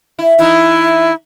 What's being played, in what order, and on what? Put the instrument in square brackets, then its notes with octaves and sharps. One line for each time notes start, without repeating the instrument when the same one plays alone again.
[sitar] E4
[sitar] E3 D#4 [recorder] E4